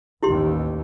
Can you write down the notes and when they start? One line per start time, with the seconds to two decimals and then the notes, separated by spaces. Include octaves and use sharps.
0.23 A1 D#2 E4 G4 C6